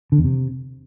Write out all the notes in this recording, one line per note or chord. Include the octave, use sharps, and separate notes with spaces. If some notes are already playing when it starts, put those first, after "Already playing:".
D3
E2
C3